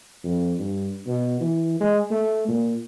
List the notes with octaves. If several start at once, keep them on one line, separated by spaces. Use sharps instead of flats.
F2
G2
B2
E3
G#3
A3
A#2